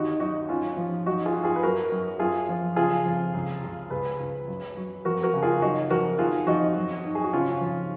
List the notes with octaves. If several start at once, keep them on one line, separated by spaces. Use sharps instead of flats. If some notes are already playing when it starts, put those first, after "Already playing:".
Already playing: D#2 D#4 F#4
F#3 D#4 F#4
G#2 C#4 F4
F3
F#3 D#4 F#4
F4 G#4
G#2
F4 G#4
B4
F#2 F#4 A#4
F#2
F#2 F4 G#4
F3
C#3 F4 G#4
F2
C#2
C#2
C#2 G#4 B4
C#2
F#2
F#3
F2 F#4 A#4
F#4 A#4
C#3
F4 G#4
F#3 D#4 F#4
F2 F#4 A#4
D#3 F4 G#4
F2 D#4 F#4
F#3
G#2
G#4
F#4
C#3 C#4 F4
F2